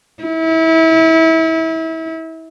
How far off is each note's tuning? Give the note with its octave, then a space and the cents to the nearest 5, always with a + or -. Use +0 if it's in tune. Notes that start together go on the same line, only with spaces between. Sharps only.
E4 -30